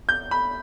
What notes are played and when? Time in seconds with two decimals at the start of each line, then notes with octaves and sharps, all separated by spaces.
0.09 G6
0.31 B5